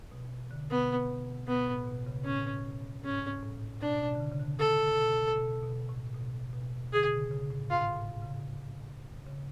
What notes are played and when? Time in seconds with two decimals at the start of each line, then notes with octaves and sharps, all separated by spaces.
0.11 B2
0.51 D3
0.70 B2 B3
1.09 B2
1.48 B2 B3
1.68 A2
1.87 B2
2.06 C#3
2.25 A2 C#4
3.04 G#2 C#4
3.43 A2
3.81 B2 D4
4.01 B2
4.15 D3
4.20 C#3
4.31 C#3
4.40 D3
4.59 A4
4.97 B2
5.36 B2
5.63 B2
5.89 A2
6.14 B2
6.53 B2
6.93 D3 G#4
7.05 B2
7.12 C#3
7.31 C#3
7.51 A2
7.70 G#2 F4
7.96 A2
8.22 C#3
9.26 C#3